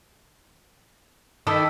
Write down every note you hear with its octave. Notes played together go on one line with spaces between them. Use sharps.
D#3 E4 A4 D5 D#6 E6 B6